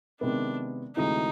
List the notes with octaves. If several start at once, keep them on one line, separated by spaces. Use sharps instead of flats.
C3 D#3 G#3 B3 D4
D2 C3 E3 G#3 D#4